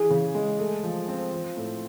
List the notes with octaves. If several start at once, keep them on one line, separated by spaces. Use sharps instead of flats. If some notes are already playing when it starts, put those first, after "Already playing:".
Already playing: E3 G#4
C#3
G#3
A3
F3
C4
F3
A2